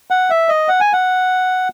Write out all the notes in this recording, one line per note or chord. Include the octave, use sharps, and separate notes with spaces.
F#5
E5
D#5
F#5
G#5
F#5